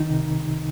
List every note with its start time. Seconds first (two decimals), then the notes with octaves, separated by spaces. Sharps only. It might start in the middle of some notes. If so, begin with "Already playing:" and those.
Already playing: C2 D#3 D#4
0.10 C3